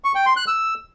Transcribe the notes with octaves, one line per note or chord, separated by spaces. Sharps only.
C#6
G5
C6
F#6
E6